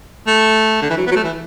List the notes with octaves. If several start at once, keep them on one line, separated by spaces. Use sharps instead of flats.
A3
D3
E3
F#3
B3
F#3
A3
E3